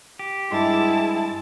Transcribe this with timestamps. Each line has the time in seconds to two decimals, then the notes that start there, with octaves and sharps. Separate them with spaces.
0.19 G4
0.51 G2 G#3 E4 G#4 A5 C6